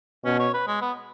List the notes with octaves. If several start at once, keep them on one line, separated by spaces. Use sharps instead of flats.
B2 C#4
C#5
B4
G#3
B3